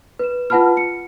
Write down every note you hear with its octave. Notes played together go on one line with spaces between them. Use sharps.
B4 E7
F4 B4 F#5 A5 B5 F6
C#7